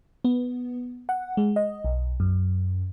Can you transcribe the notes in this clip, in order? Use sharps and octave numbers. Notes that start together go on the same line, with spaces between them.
B3
F#5
G#3
D#5
B1
F#2